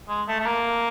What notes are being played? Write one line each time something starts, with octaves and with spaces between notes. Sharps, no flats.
G#3
A3
A3
A#3